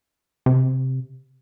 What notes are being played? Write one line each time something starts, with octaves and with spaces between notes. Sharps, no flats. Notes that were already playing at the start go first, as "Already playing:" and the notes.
C3